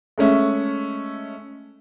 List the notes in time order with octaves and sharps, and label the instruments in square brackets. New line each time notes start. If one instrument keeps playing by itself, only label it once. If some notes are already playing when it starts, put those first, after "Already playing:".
[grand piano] G#3 A3 C#4 E5